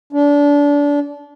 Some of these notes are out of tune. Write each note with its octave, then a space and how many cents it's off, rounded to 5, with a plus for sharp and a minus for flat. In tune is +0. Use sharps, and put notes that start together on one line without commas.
D4 -25